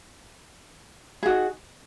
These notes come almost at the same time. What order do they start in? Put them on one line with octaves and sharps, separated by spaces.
G#4 F#4 D#4